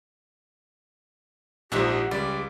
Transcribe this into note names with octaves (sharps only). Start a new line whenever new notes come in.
A#1 G#2 F3 F#4 G4 E5 F#5
G4
C#2 G3 G#4 D5